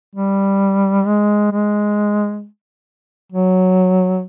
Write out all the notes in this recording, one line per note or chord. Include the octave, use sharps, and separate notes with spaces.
G3
G#3
G#3
F#3